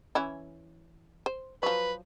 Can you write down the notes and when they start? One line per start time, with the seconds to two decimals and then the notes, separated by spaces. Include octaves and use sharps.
0.15 E3 C#4 E4
1.26 C5
1.63 F3 F#3 B4